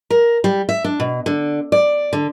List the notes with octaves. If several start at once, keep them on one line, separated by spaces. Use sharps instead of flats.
A#4
G3
E5
D4
B2
D3
D5
D3